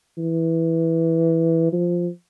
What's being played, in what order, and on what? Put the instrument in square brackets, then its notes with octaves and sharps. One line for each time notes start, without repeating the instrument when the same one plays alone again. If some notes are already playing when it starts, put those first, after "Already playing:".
[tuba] E3
F3